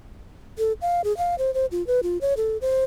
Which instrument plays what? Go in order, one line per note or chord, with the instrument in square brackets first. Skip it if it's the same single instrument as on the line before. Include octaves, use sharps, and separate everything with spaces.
[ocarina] A4
F5
G#4
F5
C5
C5
F4
B4
F4
C#5
A4
C5